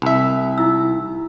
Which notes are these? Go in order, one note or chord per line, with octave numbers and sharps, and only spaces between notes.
C2 E5
D#4 E4 E6